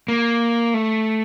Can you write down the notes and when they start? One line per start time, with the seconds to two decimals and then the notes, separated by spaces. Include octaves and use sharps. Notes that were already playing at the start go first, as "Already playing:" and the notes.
0.08 A#3
0.74 A3